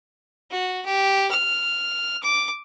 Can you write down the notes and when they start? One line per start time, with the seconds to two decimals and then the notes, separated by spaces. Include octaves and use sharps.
0.51 F#4
0.86 G4
1.31 F6
2.23 D6